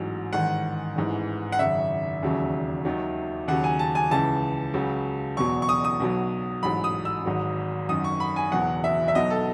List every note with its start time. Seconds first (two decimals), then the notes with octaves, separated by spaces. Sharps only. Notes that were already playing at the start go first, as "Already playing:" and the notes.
Already playing: A1 G#2 F#3
0.33 A1 G#2 D#3 F#5
0.96 A1 G#2 E3
1.52 F#5
1.59 G#1 F#2 C#3 E5
2.22 E1 D#2 C#3 F#3
2.85 D#2 D#3 F#3
3.48 D#2 C#3 F#3 F#5
3.64 G#5
3.79 A5
3.95 G#5
4.11 C#2 C#3 E3 A5
4.74 C#2 C#3 F#3
5.37 E1 E2 B2 F#3 C#6
5.62 C#6
5.69 D#6
5.84 D#6
6.00 B1 B2 F#3
6.63 A1 G#2 F#3 B5
6.84 D#6
7.05 E6
7.26 G#1 G#2 F#3
7.89 G#1 F#2 D#3 D#6
8.04 C#6
8.20 B5
8.36 G#5
8.52 F#1 E2 B2 F#3 F#5
8.84 E5
9.08 E5
9.15 B1 B2 F#3 D#5
9.30 A4